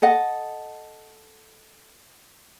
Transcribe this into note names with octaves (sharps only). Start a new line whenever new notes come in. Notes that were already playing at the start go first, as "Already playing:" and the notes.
A4 D#5 F#5